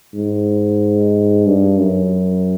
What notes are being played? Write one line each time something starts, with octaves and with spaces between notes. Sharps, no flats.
G#2
G2
F#2